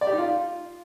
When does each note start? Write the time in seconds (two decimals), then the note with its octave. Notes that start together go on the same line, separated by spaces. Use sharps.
0.01 D5
0.07 G4
0.13 D#4
0.18 F4